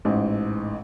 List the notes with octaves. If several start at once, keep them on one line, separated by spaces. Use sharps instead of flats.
A1 G#2